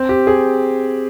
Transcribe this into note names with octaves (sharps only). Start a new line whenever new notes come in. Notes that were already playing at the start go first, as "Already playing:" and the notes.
Already playing: C4
G4
G#4